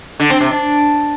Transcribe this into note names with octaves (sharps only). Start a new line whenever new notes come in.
D3
C4
C3
D4